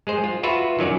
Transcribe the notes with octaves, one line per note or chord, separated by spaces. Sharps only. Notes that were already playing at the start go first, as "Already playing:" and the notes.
G#3 G#4 C5
F4
F4 F#4 B4 E5
D#3 F#3 C#4 D5